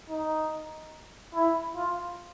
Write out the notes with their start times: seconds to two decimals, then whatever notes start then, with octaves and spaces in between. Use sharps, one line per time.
0.10 D#4
1.35 E4
1.76 F4